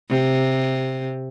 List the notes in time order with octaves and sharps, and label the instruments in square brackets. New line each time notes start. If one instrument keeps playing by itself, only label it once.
[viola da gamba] C3